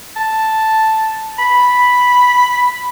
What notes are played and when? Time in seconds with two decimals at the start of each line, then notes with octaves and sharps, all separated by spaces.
0.16 A5
1.39 B5